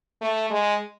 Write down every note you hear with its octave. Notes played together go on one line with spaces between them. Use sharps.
A3
G#3